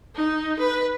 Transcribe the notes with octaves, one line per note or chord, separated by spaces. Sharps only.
D#4
B4